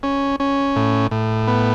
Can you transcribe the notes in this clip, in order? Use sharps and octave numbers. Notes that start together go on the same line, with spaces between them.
C#4
C#4
A2
A2
B3